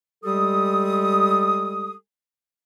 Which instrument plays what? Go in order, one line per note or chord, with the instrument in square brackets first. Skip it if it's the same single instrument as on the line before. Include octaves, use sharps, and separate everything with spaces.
[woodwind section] G3 G#3 G4 A4 D#6